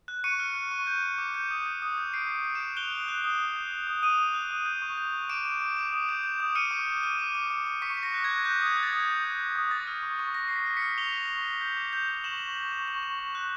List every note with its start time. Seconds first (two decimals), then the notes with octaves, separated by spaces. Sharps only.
0.08 F#6
0.24 C#6 C#7 D#7
0.40 F6
0.55 F6
0.71 C#6
0.87 G6
1.03 G6
1.18 D6
1.34 G6
1.50 D#6
1.66 G6
1.82 D#6
1.98 G6
2.14 G6 C7 D7
2.29 G6
2.45 G6
2.55 D7 E7
2.61 G6
2.77 F#6 F7 G7
2.93 F#6
3.08 F#6
3.24 D#6
3.40 D#6
3.56 G6
3.71 G6
3.87 D#6
4.03 D#6 D#7 F7
4.19 D#6
4.34 F#6
4.51 D#6
4.66 G6
4.82 C#6
4.98 G6
5.14 C#6
5.29 D6 D7 E7
5.45 D6
5.61 D6
5.77 D6
5.92 D#6
6.09 G6
6.24 G6
6.40 D#6
6.55 F6 C#7 D#7
6.71 D6
6.87 D6
7.03 F6
7.19 D6
7.35 D6
7.50 D6
7.66 D6
7.82 C#6 B6 C#7
7.97 C#6
8.03 A#6
8.14 F#6
8.24 G#6
8.29 F#6
8.45 F#6 G6
8.61 D#6
8.66 G#6
8.77 F#6
8.83 A6
8.87 G#6
8.93 D#6
9.08 D#6
9.24 G6
9.40 G6
9.56 D#6
9.71 C#6 A6
9.87 F6
10.03 C#6
10.19 C#6
10.34 C#6 A#6
10.48 C#6 C7
10.56 B6
10.66 F6
10.77 B6 C#7
10.82 F6
10.98 C#6 F7 G7
11.14 F6
11.29 C#6
11.45 C#6
11.61 G6
11.77 D6
11.93 G6
12.08 G6
12.24 C#6 E7 F#7
12.40 C#6
12.56 C#6
12.72 C#6
12.88 C#6
13.03 C#6
13.19 C#6
13.35 F#6